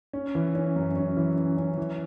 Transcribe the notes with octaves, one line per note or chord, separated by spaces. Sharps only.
C#4
E3
C#4
F#2
C#4
E3
C#4
C#4
E3